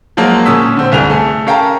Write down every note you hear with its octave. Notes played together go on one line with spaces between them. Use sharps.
F3 F#3 G#3 A#3
A#2 C#4 D#6 E6 B6
D3 C4
G1 C2 G#4 F7
A3 G#4
C#4 A#4 F5 G5 A5 A#5